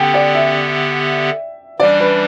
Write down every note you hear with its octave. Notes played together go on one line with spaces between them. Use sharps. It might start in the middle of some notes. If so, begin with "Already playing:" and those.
Already playing: D3 B3 G4 G5
D5
E5
E3 G3 D4 D5
B4